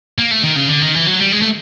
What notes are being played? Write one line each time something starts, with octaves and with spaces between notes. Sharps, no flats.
A#3
A3
D#3
C#3
D3
D#3
E3
F#3
G3
G#3
A3